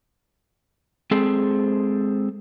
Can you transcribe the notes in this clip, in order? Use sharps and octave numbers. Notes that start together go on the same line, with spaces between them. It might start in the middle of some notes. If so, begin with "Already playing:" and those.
G#3 C4 G#4 A4 C5